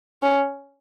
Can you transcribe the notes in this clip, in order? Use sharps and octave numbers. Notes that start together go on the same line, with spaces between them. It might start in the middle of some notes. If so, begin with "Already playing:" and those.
C#4